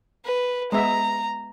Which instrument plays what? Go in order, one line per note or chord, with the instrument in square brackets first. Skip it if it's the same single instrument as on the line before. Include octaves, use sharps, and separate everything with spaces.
[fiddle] B4
[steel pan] G#3 B3 E5 [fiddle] A#5